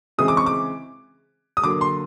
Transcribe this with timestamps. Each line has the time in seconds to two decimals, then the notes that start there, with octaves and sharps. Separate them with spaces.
0.18 C#3 E3 G#3 C4 D#6
0.28 D6
0.37 C#6
0.46 D6
1.57 D#6
1.63 D3 F#3 A#3 D6
1.81 C6